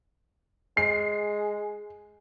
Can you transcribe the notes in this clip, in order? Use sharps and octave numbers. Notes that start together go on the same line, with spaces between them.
G#3 C7